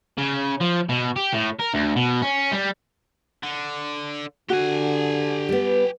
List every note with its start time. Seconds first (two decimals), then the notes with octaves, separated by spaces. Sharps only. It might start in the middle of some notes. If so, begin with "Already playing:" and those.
0.18 C#3
0.60 F3
0.89 B2
1.16 G4
1.33 A2
1.59 A#4
1.74 D2
1.96 B2
2.22 C#4
2.53 G3
3.44 D3
4.50 D3 F#4 G4 G#5
5.49 G3 B3